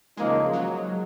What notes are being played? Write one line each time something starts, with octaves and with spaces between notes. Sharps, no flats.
C#3 F3 G#3 A#3 D#4
F#3